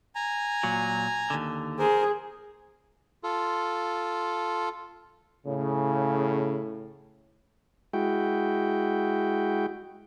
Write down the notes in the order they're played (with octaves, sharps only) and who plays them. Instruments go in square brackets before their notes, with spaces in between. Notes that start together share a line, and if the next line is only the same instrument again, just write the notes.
[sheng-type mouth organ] G#5 A#5
[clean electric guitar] A#2 F#3
D#2 D3
[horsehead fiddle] G#4 [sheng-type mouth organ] A#4 C5
[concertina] F4 A4
[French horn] A2 [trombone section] C#3
[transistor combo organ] G#3 E4 F#4 G5